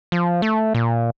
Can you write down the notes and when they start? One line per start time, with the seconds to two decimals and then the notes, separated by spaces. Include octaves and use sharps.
0.12 F3
0.42 A3
0.75 A#2